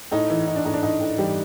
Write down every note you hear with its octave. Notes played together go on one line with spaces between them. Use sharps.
A2 D#4
E3
E3 D#4
D4
A2 D#4
D4
A2 D#4
A2
E3 G3 G4